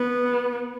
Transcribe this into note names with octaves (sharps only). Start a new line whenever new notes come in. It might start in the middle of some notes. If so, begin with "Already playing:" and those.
Already playing: B3